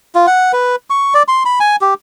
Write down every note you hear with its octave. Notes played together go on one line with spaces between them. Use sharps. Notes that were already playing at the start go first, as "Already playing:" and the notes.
F4
F#5
B4
C#6
D5
C6
B5
G#5
G4